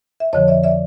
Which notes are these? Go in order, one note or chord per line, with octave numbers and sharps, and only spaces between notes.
E5
F2 D3 F3 C#5 D#5
D5 E5
D5 E5